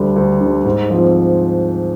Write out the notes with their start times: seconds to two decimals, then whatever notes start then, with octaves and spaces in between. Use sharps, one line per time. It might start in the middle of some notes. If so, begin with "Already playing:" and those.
Already playing: D2 D3 G3
0.16 D2
0.40 D3 G3
0.65 G#2
0.90 F3 C4